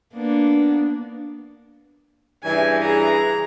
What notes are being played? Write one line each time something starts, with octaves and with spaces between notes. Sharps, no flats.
A#3 B3 D4
G2 C#3 E3 G#5
G#4 A#5